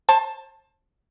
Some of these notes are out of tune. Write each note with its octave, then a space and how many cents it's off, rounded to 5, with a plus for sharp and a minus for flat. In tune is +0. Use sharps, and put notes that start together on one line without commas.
C5 +35 A5 +0